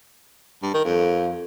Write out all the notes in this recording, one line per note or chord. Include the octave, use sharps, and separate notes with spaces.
G2
D#3
F2